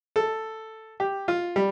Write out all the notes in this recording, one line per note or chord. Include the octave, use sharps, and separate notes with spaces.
A4
G4
F4
G3